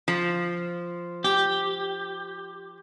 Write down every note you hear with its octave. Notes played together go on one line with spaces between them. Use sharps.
F3
G4